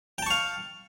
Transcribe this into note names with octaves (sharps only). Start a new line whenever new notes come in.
F5 G5 A5 C#6